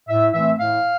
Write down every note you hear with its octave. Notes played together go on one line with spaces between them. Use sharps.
A2 E5
E3 A3 C4 E5
A2 F5